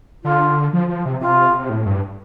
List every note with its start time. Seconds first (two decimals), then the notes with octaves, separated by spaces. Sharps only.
0.24 D3 F4
0.73 F3
0.88 F3
1.06 C3
1.21 C3 F4
1.59 C3
1.70 A2
1.86 G2